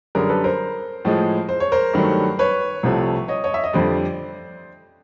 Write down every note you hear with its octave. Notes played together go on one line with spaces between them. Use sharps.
F#2 D3 G3 G#4 A#4
A4 B4
A#4 C5
A2 F3 G#3
C5
C#5
A#4 C5
G2 D#3 F#3 A3
B4 C#5
C2 C3 F3 A3
C#5 D#5
C#5 D#5
E5
D#5
F2 D3 G3 C5 D5